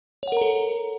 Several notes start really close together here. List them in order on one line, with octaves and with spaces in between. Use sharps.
C#5 F#5 A#4 A#5 A4